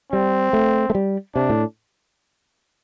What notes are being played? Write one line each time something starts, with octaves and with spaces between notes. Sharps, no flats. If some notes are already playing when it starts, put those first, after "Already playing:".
G3 C4
A3
A3
G3
C3 D4
A2